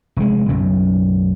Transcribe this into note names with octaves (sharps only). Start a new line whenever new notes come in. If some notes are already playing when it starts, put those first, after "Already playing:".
F1 G#3
B1 F#2 C#3